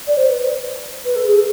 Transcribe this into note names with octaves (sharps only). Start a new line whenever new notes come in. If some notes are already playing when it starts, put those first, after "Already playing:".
D5
C5
B4
B4
A4
G#4
A4